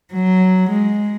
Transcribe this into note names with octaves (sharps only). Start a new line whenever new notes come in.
F#3
G#3